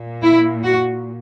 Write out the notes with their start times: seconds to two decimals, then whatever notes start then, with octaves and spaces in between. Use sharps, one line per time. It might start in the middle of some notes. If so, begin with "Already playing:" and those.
Already playing: A#2
0.22 E4
0.63 F#4